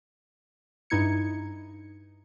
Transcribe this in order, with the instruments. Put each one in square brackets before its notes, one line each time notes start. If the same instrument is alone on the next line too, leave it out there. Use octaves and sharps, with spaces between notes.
[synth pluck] G2 D#4 E4 G#6 C#7